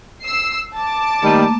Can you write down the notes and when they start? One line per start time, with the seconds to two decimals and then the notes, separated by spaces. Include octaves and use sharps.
0.23 E6 C7
0.76 A5 D6
1.22 D#3 G3 A3 A#3